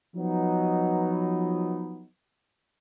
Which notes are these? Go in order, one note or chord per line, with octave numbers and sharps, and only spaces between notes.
F3 F#3 B3 D#4